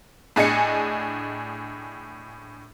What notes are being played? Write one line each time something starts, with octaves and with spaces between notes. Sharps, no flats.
A2 D4 G#4 D#5 G#5 C#7